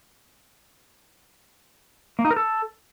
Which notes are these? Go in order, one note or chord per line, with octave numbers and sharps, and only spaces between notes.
A#3
D#4
A#4
A4